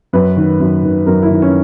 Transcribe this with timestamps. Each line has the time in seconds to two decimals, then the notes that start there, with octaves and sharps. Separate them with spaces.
0.13 F#2 B4
0.37 D#3
0.60 F#2
0.84 D#3
1.06 F#2 A#4
1.22 E4
1.30 D#3
1.42 C#4